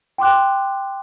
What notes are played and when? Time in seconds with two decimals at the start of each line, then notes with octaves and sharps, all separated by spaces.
0.18 G5 C6 D6 F#6